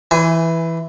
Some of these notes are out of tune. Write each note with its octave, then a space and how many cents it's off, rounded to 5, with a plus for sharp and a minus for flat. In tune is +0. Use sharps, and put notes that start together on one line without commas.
E3 +0 C5 -40 G#5 +0